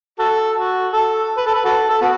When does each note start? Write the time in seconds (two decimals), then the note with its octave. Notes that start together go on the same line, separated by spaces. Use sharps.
0.19 F#4 A4
0.55 F#4
0.93 A4
1.37 B4
1.46 A4
1.54 B4
1.65 F#4 A4
1.89 A4
2.01 B3 F#4